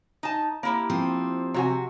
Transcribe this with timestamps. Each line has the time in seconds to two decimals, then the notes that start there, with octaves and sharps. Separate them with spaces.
0.23 D#4 A5
0.63 A#3 E4 G4
0.90 F3 C4
1.54 C3 F#4 G#5